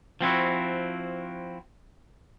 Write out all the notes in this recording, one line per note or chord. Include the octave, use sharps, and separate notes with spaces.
F3 C4 E4 F#4